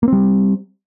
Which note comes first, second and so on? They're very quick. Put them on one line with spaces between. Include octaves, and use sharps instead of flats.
A#3 C4 G3